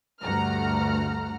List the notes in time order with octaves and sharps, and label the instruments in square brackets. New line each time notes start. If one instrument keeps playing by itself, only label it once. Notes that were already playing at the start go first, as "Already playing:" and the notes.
[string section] D2 G2 A3 F#5 A#5 F6